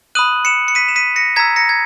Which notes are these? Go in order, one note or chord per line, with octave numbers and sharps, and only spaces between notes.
B5 D#6 F#6 D#7 F#7
C#7 E7
C#7
B6 D#7
E7
B6 D#7
A#6 C#7
A#5 E6 G#6 B6
A#6 C#7
G#6